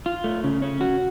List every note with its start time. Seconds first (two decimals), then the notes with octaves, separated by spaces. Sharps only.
0.06 F4
0.24 A3
0.44 C#3
0.62 C#4
0.81 F#4